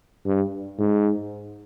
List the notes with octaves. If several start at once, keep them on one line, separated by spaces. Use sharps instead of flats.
G2
G#2